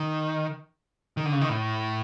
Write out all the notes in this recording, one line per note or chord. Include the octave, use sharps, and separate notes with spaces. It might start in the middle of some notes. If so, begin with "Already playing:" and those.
Already playing: D#3
D#3
D3
C#3
D#3
A2